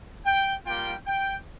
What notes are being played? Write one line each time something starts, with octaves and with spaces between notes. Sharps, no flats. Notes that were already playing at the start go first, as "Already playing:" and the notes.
G5
G3 A#3 F4 G5
G5